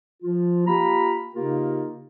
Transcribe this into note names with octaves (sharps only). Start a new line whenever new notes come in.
F3 F4
A#3 F4 G4 A#5 B5
C#3 A#3 D#4 F4 G4 A#4